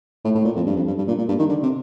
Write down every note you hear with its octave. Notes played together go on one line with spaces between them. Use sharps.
A2
A2
A#2
F2
G2
F2
G2
G2
A#2
A#2
G2
D#3
D3
C3